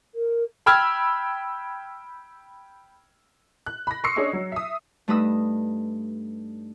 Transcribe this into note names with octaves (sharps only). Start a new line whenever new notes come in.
A#4
G5 B5 E6 F6 G#6
F#6
B5 A#6
C6 C#6 D#6 E6 C7 C#7
C#4 D4 G#4 C#5 D#5 C#6
F#3
E5 D#6
G2 A3 D#4 B4 D#6 E6